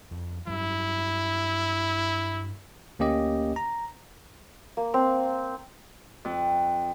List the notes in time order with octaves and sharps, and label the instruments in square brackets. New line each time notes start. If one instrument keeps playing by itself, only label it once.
[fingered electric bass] F2
[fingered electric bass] G2 F#3 [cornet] E4
[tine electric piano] D2 A#3 C#4 G4 D#5
A#5
[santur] A#3
C4
[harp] F2